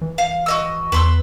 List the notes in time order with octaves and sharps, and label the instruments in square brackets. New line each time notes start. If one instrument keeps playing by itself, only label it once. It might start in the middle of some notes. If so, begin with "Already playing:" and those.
[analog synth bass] E3
[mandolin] F5
F#4 D#5 E6
[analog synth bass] E2 [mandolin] B4 C6 E6